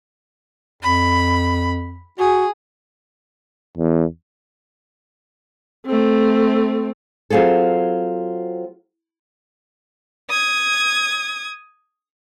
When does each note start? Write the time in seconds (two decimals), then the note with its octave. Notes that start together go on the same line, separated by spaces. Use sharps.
0.83 F2 B5
2.19 F#4 G#4
3.78 E2
5.86 A3 C4
7.30 F#3 C4 F4 G#4 A4
10.29 D#6 G#6